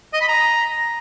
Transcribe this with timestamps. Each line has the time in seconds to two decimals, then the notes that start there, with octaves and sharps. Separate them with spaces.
0.13 D#5
0.21 B5
0.28 A#5